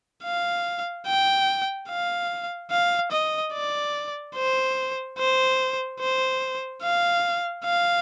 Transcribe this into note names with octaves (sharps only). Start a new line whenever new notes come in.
F5
G5
F5
F5
D#5
D5
C5
C5
C5
F5
F5